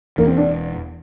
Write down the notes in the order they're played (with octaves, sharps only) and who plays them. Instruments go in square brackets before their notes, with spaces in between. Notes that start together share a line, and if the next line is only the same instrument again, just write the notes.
[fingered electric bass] E1 E2 E3 [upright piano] A#3
[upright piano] C4
D4